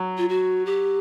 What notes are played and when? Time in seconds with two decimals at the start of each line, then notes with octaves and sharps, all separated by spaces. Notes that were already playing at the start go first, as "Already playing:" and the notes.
Already playing: F#3
0.18 F4
0.29 F#4
0.66 G4